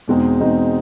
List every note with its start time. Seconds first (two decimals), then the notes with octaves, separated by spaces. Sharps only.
0.08 E2 B2 G#3 C4 D#4
0.40 E2 B2 G#3 C4 D#4